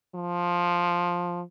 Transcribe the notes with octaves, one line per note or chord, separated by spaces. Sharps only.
F3